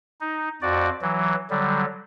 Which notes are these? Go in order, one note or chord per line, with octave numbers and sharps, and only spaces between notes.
D#4
F2 F#4 D5
E3 F#3
D3 F#3 G3